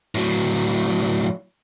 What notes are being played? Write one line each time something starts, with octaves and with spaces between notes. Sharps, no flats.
A2 F#3